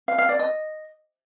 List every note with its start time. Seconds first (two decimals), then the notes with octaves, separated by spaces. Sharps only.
0.08 F5
0.18 F5
0.29 D5
0.39 D#5